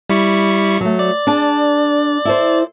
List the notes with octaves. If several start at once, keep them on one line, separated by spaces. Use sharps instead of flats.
G3 E4 C#6
F#3 A3
D5
D4 G#4 A5
E4 A4 C5